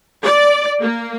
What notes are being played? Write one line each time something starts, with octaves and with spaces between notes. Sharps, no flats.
D5
A#3